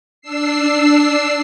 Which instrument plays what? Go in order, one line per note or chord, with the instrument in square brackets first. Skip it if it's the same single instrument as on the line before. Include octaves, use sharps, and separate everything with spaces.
[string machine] D4 E6 C7